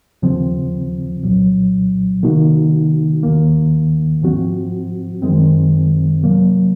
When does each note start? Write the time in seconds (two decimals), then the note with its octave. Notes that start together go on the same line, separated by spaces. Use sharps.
0.22 D#2 C#3 F3 C4
1.23 C2 A#2 F#3
2.23 C3 D#3 A#3 D#4 F#4
3.23 D#2 D#3 A#3
4.22 G#2 F3 C4 F#4
5.22 F#2 D#3 G#3 C4
6.22 C3 F#3 A#3